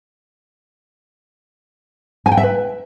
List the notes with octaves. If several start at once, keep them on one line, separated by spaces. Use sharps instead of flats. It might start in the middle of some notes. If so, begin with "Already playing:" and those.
G#5
G5
E5
B4